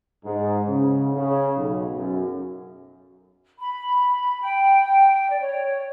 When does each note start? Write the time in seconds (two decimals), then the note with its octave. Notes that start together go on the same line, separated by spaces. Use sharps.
0.25 G#2
0.69 C#3
1.13 C#3
1.56 B1
1.95 F#2
3.60 B5
4.41 G5
5.29 D5
5.41 C#5